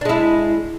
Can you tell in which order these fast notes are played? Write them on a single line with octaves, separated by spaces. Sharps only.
D4 G#3 E4